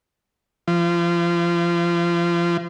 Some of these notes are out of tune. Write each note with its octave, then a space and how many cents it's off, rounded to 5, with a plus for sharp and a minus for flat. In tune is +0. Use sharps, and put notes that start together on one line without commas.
F3 -30